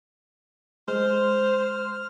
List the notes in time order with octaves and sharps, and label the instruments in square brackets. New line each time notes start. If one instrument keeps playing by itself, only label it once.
[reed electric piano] G#3 [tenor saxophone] C5 [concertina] F6